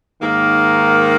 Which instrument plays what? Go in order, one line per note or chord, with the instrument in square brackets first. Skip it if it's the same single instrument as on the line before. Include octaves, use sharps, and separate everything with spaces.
[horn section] G#2 D#3 A#3